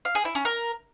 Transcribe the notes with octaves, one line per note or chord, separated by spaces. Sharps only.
F5
G#4
E4
C#4
A#4